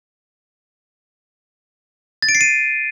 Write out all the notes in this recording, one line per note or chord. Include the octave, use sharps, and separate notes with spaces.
A6
D7
C7
D#7